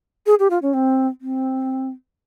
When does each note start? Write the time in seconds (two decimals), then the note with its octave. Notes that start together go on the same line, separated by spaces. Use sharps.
0.26 G#4
0.39 G4
0.50 F4
0.62 C#4
0.73 C4
1.21 C4